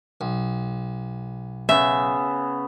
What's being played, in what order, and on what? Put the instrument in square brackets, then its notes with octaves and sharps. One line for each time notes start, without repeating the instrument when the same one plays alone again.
[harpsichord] B1
[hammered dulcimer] C#3 B3 [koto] E5